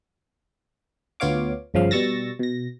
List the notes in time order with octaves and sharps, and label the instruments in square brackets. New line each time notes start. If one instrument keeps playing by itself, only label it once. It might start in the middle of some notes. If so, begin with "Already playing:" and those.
[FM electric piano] D2 B3 F4 C#5 F5 D6
G1 C#3 F3 F5
B2 G3 C#6 E6 A6 A#6
B2 A#6